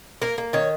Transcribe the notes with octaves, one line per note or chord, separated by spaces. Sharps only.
A#3 A#4
A#3
D#3 C#5